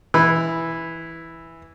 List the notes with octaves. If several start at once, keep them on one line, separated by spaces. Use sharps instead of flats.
E3 B5